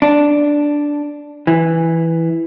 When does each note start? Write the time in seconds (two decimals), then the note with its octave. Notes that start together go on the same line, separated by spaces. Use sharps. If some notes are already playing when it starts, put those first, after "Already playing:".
0.02 D4
1.47 E3